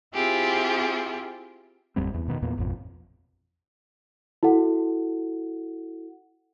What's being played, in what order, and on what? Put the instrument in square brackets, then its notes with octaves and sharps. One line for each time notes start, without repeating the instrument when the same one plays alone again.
[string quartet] C4 E4 F4 G4 G#4
[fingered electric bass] A1 F2 G3 C4
E2
B2 D#3
E2 A#2 B3
A1 F2 B2
[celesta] E4 F#4 A4 F#5